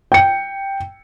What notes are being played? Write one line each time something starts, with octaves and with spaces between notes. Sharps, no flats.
G5 C#7